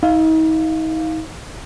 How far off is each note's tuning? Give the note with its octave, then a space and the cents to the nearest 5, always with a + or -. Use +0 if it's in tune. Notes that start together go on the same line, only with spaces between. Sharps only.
D#4 +40 F5 +0